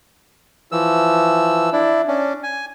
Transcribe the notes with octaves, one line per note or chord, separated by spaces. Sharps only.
E3 F3 E6
D4 E4
C#4 D4
G#5